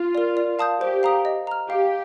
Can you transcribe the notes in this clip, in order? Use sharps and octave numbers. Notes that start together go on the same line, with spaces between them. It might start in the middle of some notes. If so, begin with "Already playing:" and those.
Already playing: F4
A#4 D5
D5
F5 A5 D#6 G6
G4 C5
F5 A#5 D#6
D#5
A#5 F6
G4 F5